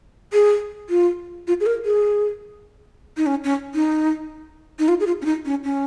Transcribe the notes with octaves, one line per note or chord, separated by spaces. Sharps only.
G#4
F4
F4
G#4
A#4
G#4
D#4
C#4
C#4
D#4
D#4
F4
G#4
F4
C#4
D#4
C#4
C#4